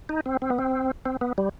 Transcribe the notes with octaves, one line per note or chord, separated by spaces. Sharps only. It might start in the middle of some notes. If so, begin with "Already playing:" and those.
D#4
C4
C4
B3
C4
C4
B3
G3